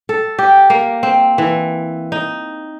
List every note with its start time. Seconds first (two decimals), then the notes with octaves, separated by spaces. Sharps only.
0.09 A4
0.39 G4
0.70 A#3
1.03 C4
1.38 E3
2.12 D#4